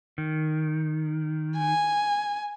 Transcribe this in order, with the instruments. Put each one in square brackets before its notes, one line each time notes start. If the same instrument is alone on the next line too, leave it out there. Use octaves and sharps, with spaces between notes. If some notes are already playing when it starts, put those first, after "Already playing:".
[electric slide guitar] D#3
[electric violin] G#5